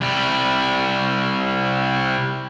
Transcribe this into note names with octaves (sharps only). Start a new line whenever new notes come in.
C2 G3